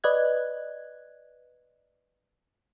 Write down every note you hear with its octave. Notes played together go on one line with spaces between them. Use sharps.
B4 D5 D#5 F#6 G#6